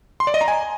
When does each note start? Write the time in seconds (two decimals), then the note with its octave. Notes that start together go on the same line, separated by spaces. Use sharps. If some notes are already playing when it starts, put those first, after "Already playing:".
0.20 C6
0.27 D5
0.34 D#5
0.41 A#5
0.48 G#5